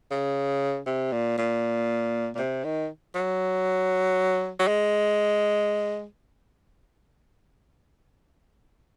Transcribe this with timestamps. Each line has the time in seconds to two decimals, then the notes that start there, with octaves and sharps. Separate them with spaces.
0.11 C#3
0.86 C3
1.12 A#2
1.38 A#2
2.35 A#2
2.38 C3
2.64 D#3
3.15 F#3
4.59 F#3
4.68 G#3